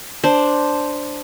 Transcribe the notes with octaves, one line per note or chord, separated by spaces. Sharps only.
D4 C5